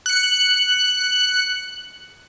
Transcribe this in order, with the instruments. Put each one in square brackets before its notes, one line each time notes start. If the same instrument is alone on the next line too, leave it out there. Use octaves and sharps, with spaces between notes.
[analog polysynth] F#6 C#7